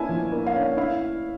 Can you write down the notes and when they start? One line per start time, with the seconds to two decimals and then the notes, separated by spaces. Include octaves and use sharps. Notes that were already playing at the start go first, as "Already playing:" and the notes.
Already playing: A#3 C#4 E4 G#5 A5
0.09 F3
0.32 A#3
0.47 F5
0.55 C#4
0.77 E4 F5